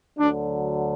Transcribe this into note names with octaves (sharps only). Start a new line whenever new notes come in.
D2 D3 F#3 D4